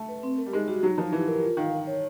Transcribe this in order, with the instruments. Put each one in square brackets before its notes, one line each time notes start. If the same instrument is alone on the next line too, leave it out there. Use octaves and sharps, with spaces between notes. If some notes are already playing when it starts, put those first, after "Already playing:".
Already playing: [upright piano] A3
[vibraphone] B4
C4
A#4
[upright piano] G3
[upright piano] G#3 [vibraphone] D#4
[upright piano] G3 [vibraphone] F#4
[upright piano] F#3 [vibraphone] D#4
[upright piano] F3 [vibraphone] D#4
[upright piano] E3 [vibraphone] G4
[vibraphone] A#4
F4
[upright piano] D#3 [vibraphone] F5
[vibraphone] A#4
C#5